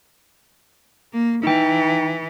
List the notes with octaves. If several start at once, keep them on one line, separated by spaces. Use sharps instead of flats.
A#3
E3 D#4 G5